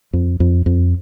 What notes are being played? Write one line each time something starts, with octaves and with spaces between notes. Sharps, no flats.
F2
F2
F2